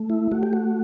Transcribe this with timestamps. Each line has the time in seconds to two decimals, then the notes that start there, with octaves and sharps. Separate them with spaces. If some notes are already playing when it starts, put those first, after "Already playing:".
Already playing: A3
0.10 E4
0.31 A3 F#4
0.43 G4
0.53 F#4